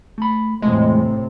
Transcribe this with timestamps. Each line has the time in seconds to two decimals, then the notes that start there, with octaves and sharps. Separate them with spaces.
0.18 A3 B5
0.62 E2 A2 C3 G#3 A3